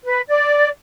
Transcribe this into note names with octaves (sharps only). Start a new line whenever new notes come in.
B4
D5